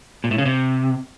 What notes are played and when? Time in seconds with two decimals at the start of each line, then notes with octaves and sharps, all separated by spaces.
0.24 A#2
0.31 A2
0.38 C#3
0.46 C3